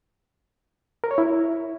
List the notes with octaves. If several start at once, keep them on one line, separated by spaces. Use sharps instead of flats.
A#4
C#5
E4